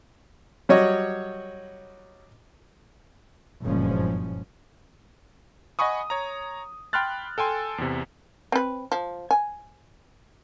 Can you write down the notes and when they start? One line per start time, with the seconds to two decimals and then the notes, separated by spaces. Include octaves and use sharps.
0.69 F#3 G3 F#4 C#5 D#5
3.63 F#1 G2 A#2 F3 G#3 C#4
5.79 D#5 F#5 G#5 B5 C#6 D#6
6.10 C#5 A#5
6.93 G5 B5 C6 F6 F#6 A6
7.38 A4 G5 G#5 C6
7.78 E2 C3
8.52 C4 B4
8.92 F3
9.31 G#5